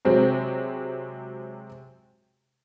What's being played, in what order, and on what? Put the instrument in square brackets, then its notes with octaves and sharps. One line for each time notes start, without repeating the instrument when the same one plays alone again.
[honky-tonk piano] C3 F#3 G#3 C4